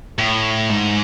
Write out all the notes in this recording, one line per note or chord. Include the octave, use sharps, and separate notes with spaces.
A2
G#2